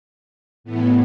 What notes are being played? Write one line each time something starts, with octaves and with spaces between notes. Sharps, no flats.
A2 E3 B3